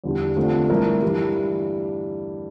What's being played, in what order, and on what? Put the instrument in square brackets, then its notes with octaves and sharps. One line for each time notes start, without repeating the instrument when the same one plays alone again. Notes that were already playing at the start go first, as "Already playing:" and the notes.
[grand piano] E2 D3 G3 D4 G4
D3 A3 C4 F4 A4
G2 E3 A3 E4 A#4
G2 E3 G3